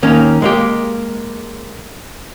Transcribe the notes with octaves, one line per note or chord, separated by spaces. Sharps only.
D#2 D#3 A#3 C#4
G#3 A#3 G4